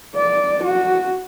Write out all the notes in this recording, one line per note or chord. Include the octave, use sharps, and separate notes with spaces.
D5
F#4